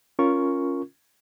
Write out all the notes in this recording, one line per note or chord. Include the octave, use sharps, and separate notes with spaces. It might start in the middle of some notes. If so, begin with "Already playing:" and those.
C#4 F4 A#4 C#6